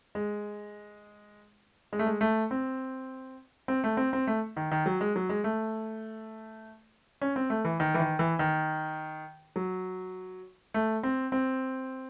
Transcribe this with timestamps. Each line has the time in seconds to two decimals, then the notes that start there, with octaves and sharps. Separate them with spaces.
0.15 G#3
1.93 G#3
1.99 A3
2.07 G#3
2.21 A3
2.51 C4
3.68 C4
3.84 A3
3.97 C4
4.13 C4
4.27 A3
4.57 D#3
4.71 D#3
4.86 F#3
5.01 G#3
5.16 F#3
5.29 G#3
5.44 A3
7.21 C#4
7.36 C4
7.50 A3
7.65 E3
7.80 D#3
7.94 E3
8.00 D#3
8.19 E3
8.39 D#3
9.56 F#3
10.74 A3
11.03 C4
11.32 C4